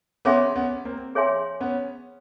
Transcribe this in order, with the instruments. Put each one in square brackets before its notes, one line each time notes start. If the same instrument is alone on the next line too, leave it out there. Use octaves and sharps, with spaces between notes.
[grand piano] B3 C#4 [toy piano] G#4 C#5 E5 G#5 C6
[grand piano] B3 C#4
A#3 C4
[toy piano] G#4 C#5 E5 G#5 C6
[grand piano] B3 C#4